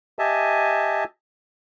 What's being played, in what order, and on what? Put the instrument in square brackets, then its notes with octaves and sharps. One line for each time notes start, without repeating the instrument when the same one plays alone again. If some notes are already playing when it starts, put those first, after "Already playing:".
[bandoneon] G4 D#5 E5 G#5 A5